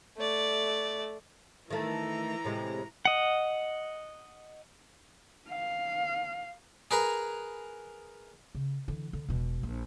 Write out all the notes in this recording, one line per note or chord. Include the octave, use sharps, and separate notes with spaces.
A3 D5
D#3 E3 A3 A#5
A2 C3 G#3
D#5 F#5
F5
G#4 A#4 B4 A#5
C#3
D3 E3
D3
E1 B2
A#1